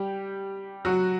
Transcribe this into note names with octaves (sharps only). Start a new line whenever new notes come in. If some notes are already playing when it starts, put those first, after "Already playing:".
Already playing: G3 G4
F#3 F#4